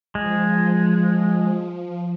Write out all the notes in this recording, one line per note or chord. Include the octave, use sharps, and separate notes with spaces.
F3 G#3